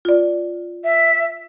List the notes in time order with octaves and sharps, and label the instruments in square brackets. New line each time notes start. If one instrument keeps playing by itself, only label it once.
[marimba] F4 D5
[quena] E5